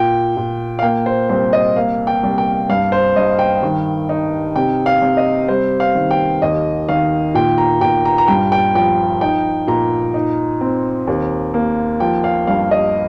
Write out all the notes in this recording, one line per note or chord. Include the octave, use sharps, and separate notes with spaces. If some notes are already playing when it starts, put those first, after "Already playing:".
Already playing: A#2 G5
A#2
F5
A#3 G5
C5
C2 C5
D#5
A#3 F5
G5
C2
G5
G2 F5
C5
G2 D#5
G5
D#3
D#4
C3 G5
F5
C3
D#5
G3 C5
F5
D#3
G5
D#2 D#5
D#3 F5
A#2 G5
A#5
A#2 G5
A#5
A#5
G2 G5
G5
F3 G5
D#4 G5
A#2 A#5
D#4
C4
D#2
A#3
F3 G5
F5
G2 F5
D#5